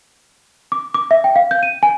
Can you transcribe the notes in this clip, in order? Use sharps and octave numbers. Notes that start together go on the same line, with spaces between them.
D6
D6
E5
G5
F5
G6
D#7
G#5